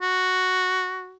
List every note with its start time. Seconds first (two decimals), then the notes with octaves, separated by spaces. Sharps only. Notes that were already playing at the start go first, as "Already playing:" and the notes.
0.02 F#4